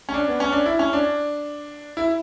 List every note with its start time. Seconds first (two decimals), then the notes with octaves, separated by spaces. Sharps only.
0.09 C#4
0.14 D4
0.28 B3
0.40 C#4
0.53 D4
0.66 E4
0.79 C#4
0.93 D4
1.97 E4